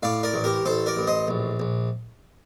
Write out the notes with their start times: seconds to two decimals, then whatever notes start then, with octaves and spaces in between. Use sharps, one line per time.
0.03 A2 D5 F5
0.23 A#4 D5
0.34 A1
0.44 G4 A#4
0.65 A1 A4 C5
0.86 A#4 D5
0.97 A1
1.07 C5 D#5
1.28 A#1
1.60 A#1